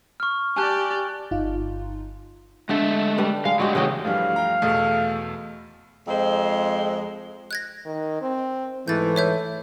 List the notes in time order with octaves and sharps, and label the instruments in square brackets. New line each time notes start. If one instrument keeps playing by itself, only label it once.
[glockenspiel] C#6 F6
[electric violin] G4 D5 [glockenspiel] G#5 A5 F#6
[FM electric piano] G1 D#4 F4
[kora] D3 A4 [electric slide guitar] G#3 A3 E5
[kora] G3 D4 B4
[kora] G#3 [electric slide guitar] F5
[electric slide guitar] F#3 G#3 [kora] F#4 G4
[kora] C#3 D#5 G5 [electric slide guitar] E3 F#3 A3
[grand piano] G2 E3 G3 [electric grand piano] F3 A3 [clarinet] F5
[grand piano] G5 A#5
[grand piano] E2 B2 [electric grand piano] A3 G#4 A4
[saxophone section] F2 G#3 C5
[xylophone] F#6 G#6 A#6
[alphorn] D#3
C4
[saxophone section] G#2 E3 [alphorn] A3 [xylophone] G6 A6
[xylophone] C#5 E5 G6